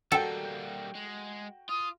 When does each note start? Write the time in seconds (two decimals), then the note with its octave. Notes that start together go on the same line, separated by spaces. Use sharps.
0.12 G3 A#3 F#4 A4 G5
0.95 G#3
1.69 F4 D#6